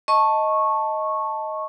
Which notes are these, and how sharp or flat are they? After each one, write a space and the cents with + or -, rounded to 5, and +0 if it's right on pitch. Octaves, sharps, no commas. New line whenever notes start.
D#5 +10 A5 +0 C#6 -15